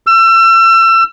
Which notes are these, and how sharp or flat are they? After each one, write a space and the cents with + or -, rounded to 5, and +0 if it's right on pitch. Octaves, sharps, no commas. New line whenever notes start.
E6 +35